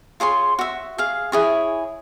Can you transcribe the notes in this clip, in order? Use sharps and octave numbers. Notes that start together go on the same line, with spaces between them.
F4 G#4 C#5 C6
F#4 E5
G#4 F5
E4 G#4 C#5